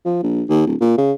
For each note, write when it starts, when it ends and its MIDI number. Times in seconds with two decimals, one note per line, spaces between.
0.05 0.19 53
0.23 0.43 34
0.49 0.62 39
0.67 0.75 26
0.81 0.95 46
0.98 1.13 49